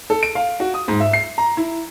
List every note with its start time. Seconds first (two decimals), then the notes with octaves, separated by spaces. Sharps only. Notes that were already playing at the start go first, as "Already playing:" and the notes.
0.10 A4
0.23 D7
0.35 F5
0.60 F#4
0.74 D#6
0.88 G#2
1.00 E5
1.13 C7
1.38 A#5
1.57 E4